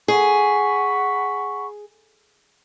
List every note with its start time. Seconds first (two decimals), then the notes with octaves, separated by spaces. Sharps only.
0.08 G#4 F#5 B5 C#6